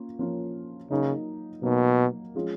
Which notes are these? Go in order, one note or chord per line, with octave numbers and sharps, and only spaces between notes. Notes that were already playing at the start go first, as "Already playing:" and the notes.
Already playing: A#3 C#4 F4
F3 A#3 C#4 F4
C#3 F#3 A#3 D#4
B2 F#3 A#3 D#4
F3 G#3 C#4 F4